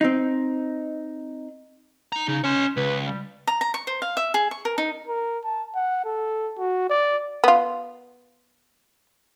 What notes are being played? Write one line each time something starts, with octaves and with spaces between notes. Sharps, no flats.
C4 D#4
D#4 A#5
C#3 D#4
C#4 C#5 C6
C#2 B4
G3
A#5
A#5
C#6
C5
F5
E5
G#4
C#6
A#4
D#4
A#4
A5
F#5
A4
F#4
D5
B3 F4